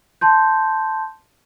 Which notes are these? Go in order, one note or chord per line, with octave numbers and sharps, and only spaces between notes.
A5 C6 G6